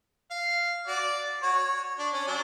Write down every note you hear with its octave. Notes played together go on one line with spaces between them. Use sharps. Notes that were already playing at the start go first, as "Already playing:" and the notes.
F5
F#4 D5
F#4 C#5
D4
C#4
F#3 D4